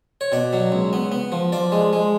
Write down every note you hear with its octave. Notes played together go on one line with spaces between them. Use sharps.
C#5
B2 D5
F#3
C#2
B3
B3
F3
F3 D5
G#3
G#3